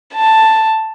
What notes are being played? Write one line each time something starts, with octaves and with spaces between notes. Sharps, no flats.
A5